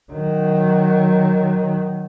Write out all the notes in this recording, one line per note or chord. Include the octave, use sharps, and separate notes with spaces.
D#3 F#3